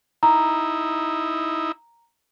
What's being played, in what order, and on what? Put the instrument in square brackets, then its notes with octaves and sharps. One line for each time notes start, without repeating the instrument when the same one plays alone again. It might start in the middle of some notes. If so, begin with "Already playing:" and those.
[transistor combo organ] D#4 E4 [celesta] A#5